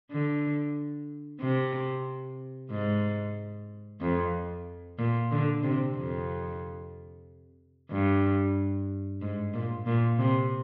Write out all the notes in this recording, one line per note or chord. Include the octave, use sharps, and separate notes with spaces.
D3
C3
G#2
F2
A#2
D3
C3
F2
G2
G#2
A#2
A#2
C3